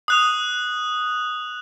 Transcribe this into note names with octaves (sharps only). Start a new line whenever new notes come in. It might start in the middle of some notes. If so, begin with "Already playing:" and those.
D#6 F#6 F7